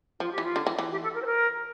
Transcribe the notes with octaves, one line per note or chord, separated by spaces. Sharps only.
F3 F4
G4
E3
F4
D3
E3
E3
G4
A4
A#4
C5
A#4